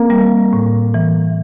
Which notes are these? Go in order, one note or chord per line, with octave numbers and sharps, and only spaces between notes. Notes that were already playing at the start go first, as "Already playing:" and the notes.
Already playing: A#3 C4
G3
A2
E3